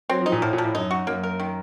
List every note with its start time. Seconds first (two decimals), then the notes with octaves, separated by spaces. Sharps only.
0.09 F#3 C4
0.21 F3
0.26 D#4
0.32 A#2
0.42 A2 F3
0.53 A#2
0.58 F3
0.64 A2
0.75 F#2 D#4
0.91 F#4
1.07 F#2 A#3
1.23 A#4
1.40 D#3